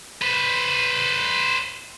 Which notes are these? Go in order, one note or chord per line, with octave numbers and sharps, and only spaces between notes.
B4 C5